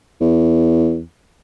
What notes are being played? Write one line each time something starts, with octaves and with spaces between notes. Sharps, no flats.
E2